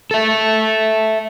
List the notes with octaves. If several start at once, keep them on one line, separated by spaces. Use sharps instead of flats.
A4 E5